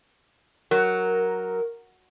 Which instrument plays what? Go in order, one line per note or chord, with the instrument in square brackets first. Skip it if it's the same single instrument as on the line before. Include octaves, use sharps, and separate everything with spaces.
[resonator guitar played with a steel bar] F#3 [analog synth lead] A#4